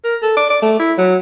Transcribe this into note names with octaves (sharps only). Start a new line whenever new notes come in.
A#4
A4
D5
D5
A3
E4
F#3